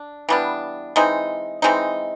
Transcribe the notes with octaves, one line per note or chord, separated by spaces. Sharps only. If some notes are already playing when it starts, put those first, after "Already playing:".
Already playing: D4
E3 G3 B3 D4
E3 G#3 C4 D#4
E3 G#3 C4 D#4